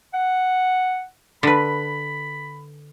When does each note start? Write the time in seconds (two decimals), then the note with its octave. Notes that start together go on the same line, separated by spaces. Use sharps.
0.14 F#5
1.43 D3 B4 B5